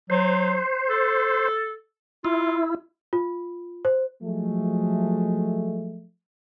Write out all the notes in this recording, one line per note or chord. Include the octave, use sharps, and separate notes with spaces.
F#3 C5
A4
E4 F4
F4
C5
F3 F#3 G#3 A3